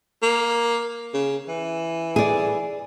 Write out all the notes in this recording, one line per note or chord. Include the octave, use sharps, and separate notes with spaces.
A#3
C#3
E3
G#4 D5